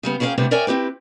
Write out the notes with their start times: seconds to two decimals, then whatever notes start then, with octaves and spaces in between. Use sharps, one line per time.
0.03 C#3 G3 B3
0.20 A#3 C#4 G#4 B4 F5 G5
0.38 C3 G3 A3 B3 D4
0.51 A#4 C#5 D5 E5 G5 G#5
0.67 C4 E4 G4 B4